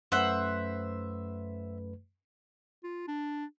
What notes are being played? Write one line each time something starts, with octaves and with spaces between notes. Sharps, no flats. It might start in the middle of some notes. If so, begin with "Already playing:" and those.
F#2 A3 B4 C5 E5 F#5
F4
D4